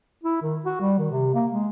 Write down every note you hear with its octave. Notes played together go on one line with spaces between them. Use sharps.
E4
D#3
F#4
G3
D#3
C3
A#3
G#3